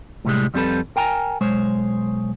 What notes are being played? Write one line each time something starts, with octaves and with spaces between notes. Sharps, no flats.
A2 C3 G3 G#3
F2 G3 C4 F#4 A4 B4
A#4 G5 G#5 A#5
B1 G#3 C5 C#5